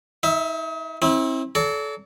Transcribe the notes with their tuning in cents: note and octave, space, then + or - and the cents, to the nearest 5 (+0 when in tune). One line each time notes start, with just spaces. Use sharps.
D#4 +40 E5 +0
C4 +35 E4 -30
A4 -25 D5 -45 A#5 -35